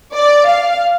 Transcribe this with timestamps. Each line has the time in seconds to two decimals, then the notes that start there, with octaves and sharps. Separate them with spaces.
0.15 D5
0.47 F5